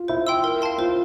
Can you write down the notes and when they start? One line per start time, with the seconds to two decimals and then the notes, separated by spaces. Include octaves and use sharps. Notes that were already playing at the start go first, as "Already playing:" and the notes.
Already playing: F4
0.08 E4 C5
0.27 G5 C6 E6
0.44 A#4
0.62 F5 A5 C6
0.78 F4 C5